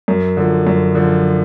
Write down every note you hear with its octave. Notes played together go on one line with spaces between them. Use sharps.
F#2
D3 F3
F#2
D3 F3